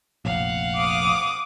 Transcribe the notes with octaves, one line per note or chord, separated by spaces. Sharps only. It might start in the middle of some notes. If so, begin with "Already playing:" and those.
F1 A#1 F5 F#5
D6 D#6